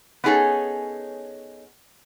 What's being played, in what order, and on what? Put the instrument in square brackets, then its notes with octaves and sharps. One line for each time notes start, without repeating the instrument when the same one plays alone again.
[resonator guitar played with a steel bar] B3 C#4 D#4 G#4 A4 C#5